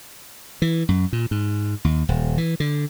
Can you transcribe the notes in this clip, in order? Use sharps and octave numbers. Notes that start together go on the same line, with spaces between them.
E3
F#2
A#2
G#2
D#2
D#1
E3
D3